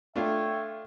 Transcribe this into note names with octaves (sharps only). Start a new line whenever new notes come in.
A3 D4 F4 C#5 E5 G5